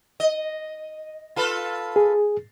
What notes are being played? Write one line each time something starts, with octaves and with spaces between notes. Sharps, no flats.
D#5
F4 A4 B4
G#4